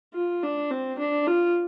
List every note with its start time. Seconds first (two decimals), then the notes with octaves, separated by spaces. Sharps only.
0.14 F4
0.42 D4
0.70 C4
0.98 D4
1.27 F4